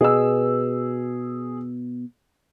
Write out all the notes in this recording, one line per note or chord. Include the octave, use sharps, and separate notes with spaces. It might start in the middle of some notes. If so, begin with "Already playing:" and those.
B2 G#4 E6